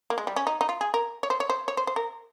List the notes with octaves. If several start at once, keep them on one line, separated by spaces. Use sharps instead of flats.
A#3
G#3
G3
C#4
D#4
D#4
F4
G#4
A#4
C#5
C5
C#5
C5
C#5
C5
C5
A#4